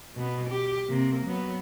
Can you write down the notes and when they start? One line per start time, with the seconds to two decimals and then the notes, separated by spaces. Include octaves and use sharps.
0.15 B2 B3
0.50 G4
0.88 C3 A#3
1.26 F#3 B3